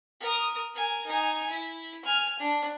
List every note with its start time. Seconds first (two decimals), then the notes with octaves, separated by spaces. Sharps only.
0.20 A#4 D#6
0.73 A#4 G#5
1.06 D#4 G#5
1.49 E4
2.04 G#5 F6
2.39 D4